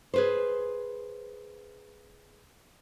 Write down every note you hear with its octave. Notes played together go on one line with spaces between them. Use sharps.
G#4 B4 C5